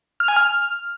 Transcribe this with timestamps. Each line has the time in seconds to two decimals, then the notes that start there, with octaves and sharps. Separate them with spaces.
0.20 F6
0.28 G#5
0.36 F6